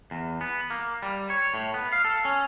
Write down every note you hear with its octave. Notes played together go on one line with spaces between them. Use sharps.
E2
B3
A#3
G3
C#5
A2
B3
F5
A4
C#4